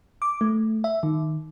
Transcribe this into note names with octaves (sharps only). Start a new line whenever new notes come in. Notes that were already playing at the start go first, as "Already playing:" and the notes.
D6
A3
E5
D#3